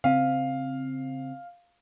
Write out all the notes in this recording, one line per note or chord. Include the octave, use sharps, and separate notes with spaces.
C#3 C4 F5